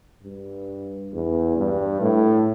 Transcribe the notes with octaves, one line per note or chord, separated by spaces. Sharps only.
G2
E2
G2
A2